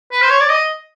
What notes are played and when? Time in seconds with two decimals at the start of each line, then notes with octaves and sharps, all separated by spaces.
0.12 B4
0.22 C5
0.30 C#5
0.41 D5
0.49 D#5